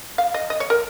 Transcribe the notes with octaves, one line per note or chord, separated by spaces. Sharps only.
F5
D#5
D#5
C#5
A#4